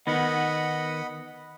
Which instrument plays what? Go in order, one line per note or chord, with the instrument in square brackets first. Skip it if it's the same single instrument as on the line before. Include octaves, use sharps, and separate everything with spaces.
[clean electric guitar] D#3 B3 [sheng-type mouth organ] D#5 F#5 B5